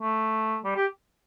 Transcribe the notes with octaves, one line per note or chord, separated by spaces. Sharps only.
A3
G3
G4